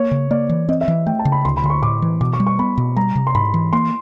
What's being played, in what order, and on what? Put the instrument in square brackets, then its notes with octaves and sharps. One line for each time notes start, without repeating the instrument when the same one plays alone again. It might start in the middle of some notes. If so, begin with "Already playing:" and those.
Already playing: [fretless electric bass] A#3 [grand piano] C#5
[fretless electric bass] C#3
[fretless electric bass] A#3 [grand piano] D5
[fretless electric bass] E3
[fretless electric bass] C4 [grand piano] D#5
[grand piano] E5
[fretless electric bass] E3
[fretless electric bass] A3 [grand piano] G5
[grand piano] A5
[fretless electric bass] C#3
[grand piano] B5
[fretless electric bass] D2 [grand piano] C6
[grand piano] B5
[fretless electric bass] D3 [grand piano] C6
[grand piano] C#6
[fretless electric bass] A2 [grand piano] D6
[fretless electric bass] E3
[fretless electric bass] B2 [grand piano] D6
[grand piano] C#6
[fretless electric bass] G3
[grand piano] C#6
[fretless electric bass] B3 [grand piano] B5
[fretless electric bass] B2
[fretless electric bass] G3 [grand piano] A#5
[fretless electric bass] C3
[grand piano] C6
[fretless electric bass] G#2 [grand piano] B5
[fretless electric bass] E3
[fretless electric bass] A#3 [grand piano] C6